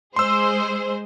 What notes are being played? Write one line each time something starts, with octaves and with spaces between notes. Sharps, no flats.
G#3 G#4 C5 C6 E6